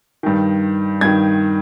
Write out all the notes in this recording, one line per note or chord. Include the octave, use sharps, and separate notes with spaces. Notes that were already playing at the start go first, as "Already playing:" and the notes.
G2 D#3
G2 D#3 G#6